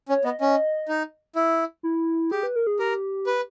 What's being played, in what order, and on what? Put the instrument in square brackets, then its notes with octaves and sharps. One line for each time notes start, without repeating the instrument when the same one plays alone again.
[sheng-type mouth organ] C#4 [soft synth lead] C#5
[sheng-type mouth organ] B3 [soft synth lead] D#5
[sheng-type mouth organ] C#4 [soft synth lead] D#5
[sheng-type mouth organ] D#4
E4
[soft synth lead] E4
[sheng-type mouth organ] G4 [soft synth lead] G#4
[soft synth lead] B4
A#4
G#4
[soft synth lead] G4 [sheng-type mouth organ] A#4
[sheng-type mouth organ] B4